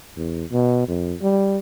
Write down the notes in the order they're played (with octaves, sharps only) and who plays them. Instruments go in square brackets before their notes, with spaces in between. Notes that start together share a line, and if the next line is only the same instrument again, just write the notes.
[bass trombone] E2
B2
F2
G3